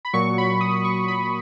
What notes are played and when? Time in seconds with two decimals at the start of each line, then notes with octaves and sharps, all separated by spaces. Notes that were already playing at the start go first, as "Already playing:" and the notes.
0.05 B5
0.13 A#2 F#3 C#6
0.38 B5
0.61 D#6
0.85 C#6
1.08 B5